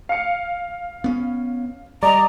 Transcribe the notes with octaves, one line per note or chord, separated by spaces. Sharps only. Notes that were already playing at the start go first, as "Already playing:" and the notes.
F5 C#7
B3 C#4
G3 D5 D#5 A#5